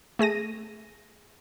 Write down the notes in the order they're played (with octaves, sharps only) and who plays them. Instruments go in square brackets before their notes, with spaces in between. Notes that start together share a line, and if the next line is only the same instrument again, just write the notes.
[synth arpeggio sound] A3 G#4 A#6 D#7